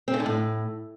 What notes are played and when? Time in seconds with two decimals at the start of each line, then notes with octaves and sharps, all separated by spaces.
0.08 C4
0.14 C#3
0.20 D3
0.26 A2